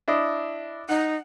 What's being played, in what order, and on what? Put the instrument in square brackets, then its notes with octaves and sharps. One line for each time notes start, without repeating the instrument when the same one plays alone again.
[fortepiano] D4 E4 D#5
[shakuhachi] D#4 [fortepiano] F#5